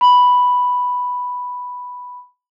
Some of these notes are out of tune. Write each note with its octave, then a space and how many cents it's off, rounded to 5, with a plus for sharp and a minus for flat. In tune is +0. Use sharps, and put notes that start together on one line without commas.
B5 +0